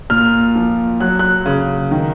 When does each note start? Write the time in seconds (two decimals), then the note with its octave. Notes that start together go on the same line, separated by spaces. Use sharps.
0.10 A#2 F6
0.56 F3
1.00 F#3 F#6
1.19 F#6
1.46 C#3
1.91 D#3